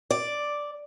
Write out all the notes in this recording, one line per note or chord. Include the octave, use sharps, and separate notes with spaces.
D5